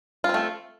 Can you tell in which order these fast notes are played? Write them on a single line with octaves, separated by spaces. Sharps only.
F4 C4 A3